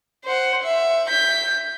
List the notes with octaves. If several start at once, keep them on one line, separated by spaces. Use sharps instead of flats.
C5 F#5
E5
G6 B6